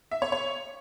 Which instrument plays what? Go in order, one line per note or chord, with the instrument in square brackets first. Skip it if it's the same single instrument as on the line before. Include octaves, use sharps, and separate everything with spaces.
[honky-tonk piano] E5
C#5
C#5